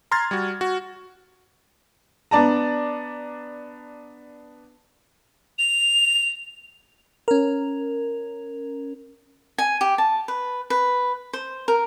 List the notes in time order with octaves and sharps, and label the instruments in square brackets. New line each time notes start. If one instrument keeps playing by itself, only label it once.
[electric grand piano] A#5 C6 F6 G#6 A6
G3 F#4
F#4
[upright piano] B3 D4 D5 A5 A#5
[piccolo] F7
[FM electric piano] C#4 A#4
[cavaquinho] G#5
G4
A5
B4
B4
C5
A#4